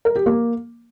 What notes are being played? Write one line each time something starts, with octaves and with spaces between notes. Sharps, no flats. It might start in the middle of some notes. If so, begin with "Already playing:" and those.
A#4
G4
A#3